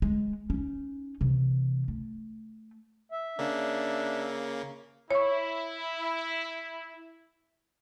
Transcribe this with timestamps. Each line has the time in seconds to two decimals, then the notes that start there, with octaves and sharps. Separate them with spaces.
0.02 G#3
0.50 C#4 D#4
1.21 C3 E3
1.88 A3
3.12 E5
3.39 C#3 A#3 D4
5.11 E4 C#5 C#6